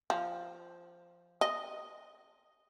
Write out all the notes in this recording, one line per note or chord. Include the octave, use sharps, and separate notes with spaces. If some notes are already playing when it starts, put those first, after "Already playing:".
F3
D#5